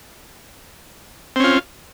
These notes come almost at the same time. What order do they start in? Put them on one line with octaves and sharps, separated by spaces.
C4 C#4 F4